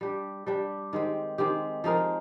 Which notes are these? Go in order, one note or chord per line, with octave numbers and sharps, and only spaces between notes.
G3 D4 G4
G3 D4 G4
D#3 G#3 C4 G4
D#3 G#3 C4 G4
F3 G#3 D#4 A#4